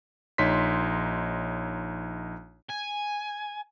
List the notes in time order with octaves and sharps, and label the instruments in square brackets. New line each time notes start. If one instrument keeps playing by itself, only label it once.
[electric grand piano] A#1 D#4 C#5 C6 B6
[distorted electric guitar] G#5